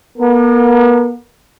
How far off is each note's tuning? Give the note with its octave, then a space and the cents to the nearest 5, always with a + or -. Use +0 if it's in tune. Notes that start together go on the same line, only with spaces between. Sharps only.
B3 -40 A#4 -30